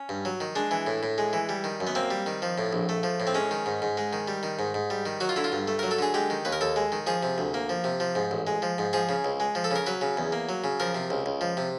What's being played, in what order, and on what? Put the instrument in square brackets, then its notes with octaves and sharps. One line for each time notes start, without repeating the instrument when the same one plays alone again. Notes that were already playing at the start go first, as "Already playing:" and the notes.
Already playing: [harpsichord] C#4
G2
F#3
D#3
G#3 D4
E3
A2
A2
G#3
E3
G3
D#3
F#2
B3
A#3 C4
G3
D#3
F3
A2
A#1
A3
F3
A2
C4
G#3 C#4
D#3
G#2
G#2
G#3
D#3
G3
D#3
G#2
G#2
G3
D#3
F#3 F#4
F4
D3 E4
F4
G2
A3
F#3 A#4
A4
D3 G#4
G#3 G4
D#3
D#2 B4
A#4
D#2 A4
G#3
D#3
F3 G#4
C3
D2
A#3
F3
C3
F3
G#2
A1
G#3
F3
G#2
F3 G#4
C#3
C#2
G#3
F3
A4
C#3 A#4
F#3 B4
C#3
E2
A#3
F#3
C#3
F3 A#4
C3
C#2
C#2
F3
C3